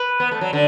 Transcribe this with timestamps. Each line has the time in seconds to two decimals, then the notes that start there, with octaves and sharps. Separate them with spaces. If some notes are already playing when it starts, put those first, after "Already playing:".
Already playing: B4
0.20 B3
0.32 A3
0.41 F#3
0.53 D3